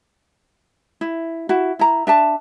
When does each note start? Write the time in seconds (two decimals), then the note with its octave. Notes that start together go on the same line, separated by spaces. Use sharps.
1.01 E4
1.49 E4 F#4
1.79 E4 A#5
2.07 D4 E5 A5